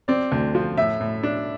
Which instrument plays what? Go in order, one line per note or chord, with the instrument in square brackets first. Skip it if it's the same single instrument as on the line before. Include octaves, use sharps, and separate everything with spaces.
[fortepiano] C4 [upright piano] D5
[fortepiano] D2
F3
[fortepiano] A2 [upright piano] E5
[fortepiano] A2
D4